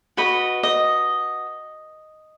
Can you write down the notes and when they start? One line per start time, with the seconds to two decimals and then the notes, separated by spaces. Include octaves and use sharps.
0.17 F#4 B4 D#5
0.63 D#5